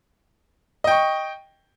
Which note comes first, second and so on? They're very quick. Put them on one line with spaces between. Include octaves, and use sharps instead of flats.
D#5 G5 C#6